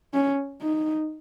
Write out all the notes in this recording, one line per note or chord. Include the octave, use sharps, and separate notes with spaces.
C#4
D#4